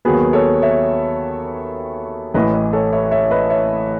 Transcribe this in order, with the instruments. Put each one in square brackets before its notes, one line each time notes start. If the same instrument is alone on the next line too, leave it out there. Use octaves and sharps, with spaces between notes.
[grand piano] D#2 D#3 F#3 B3 G#4 B4
A4 C#5
C#5 E5
A1 A2 E3 B4 D#5
B4 D#5
A4 C#5
C#5 E5
C#5 E5
B4 D#5
C#5 E5